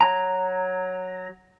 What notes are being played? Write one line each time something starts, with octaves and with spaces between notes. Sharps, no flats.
F#3 A#5